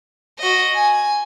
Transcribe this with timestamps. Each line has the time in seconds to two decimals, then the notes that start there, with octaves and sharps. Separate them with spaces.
0.39 F#4 D#5
0.75 G#5